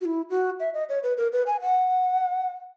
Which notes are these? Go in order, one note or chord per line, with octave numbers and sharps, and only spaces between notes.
F#4
E4
F#4
E5
D#5
C#5
B4
A#4
B4
G#5
F#5